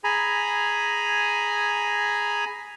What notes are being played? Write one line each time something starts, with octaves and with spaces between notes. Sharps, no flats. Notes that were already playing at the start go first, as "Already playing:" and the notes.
G#4 G#5 A#5 B5